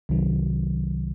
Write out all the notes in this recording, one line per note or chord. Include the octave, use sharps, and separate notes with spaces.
C2 C3 D#3 F#3